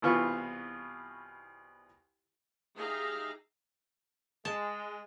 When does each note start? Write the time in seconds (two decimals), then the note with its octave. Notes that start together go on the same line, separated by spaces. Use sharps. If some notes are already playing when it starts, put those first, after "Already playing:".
0.02 C2 B2 E3 F4 B4 C#6
2.75 D#4 G4 G#4 E5 F5 A#5
4.45 G#3 A5